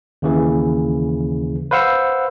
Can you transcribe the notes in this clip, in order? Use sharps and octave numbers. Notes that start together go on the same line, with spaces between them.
D#2 C#3 E3
B4 C5 F5 F#5 E6